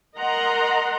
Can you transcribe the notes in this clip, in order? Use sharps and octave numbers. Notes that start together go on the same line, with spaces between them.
A#4 D#5 F#5 A#5 C6